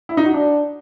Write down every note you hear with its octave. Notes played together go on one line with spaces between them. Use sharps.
E4
D#4
F#4
D4